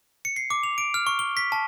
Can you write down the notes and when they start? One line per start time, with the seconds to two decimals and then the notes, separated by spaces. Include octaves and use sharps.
0.25 C#7
0.36 C7
0.50 D6
0.63 F7
0.78 D7
0.94 F6
1.07 C#6
1.19 G7
1.37 B6
1.52 A5